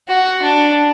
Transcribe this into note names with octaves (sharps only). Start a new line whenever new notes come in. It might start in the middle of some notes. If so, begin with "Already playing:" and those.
F#4
D4